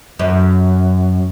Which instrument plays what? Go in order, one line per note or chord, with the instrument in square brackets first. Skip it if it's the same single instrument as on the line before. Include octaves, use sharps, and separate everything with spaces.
[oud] F#2